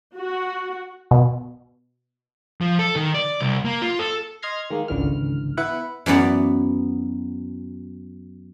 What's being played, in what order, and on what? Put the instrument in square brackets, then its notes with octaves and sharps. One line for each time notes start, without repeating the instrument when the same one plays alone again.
[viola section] F#4
[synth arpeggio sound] B2
[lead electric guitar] F3
A4
D#3
D5
C2
A#3
F4
A4
[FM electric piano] D#5 C6 F6 G#6 A#6 C7
D#3 G#3 A#3
G#1 C#2 D3 E3 F6
B3 E4 B4 F#5
[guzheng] F#2 E3 B3 D5